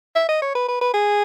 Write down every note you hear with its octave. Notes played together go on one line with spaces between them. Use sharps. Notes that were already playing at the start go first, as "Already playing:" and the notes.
E5
D#5
C#5
B4
B4
B4
G#4